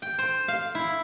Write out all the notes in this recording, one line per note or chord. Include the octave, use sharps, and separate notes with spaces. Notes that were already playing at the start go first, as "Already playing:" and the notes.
G5
C5
F5
E4